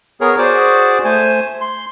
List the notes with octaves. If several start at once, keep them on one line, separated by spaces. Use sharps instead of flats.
B3 G#4 A#4 C#5
F#4 G#4 C5 D5 D6
A3 C5 G#5
C6